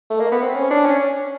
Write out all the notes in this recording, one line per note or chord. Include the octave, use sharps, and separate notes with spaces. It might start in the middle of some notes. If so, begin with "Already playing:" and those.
A3
A#3
B3
C4
C#4
D4
C#4